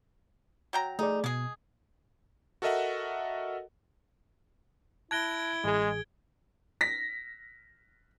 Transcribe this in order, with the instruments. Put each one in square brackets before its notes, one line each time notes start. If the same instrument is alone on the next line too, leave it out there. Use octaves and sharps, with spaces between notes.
[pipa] F#3 G5 A#5
[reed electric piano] A3 G#4 D5 [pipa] D#4
[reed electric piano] B2 [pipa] G#3 G#4
[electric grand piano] F#4 A4 A#4 D#5 E5 F#5
[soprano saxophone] E4 [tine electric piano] A5 F#6 A#6 [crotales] G#6 D7 G7
[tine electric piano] A1 G#4 [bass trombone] G#3
[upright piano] A#6 B6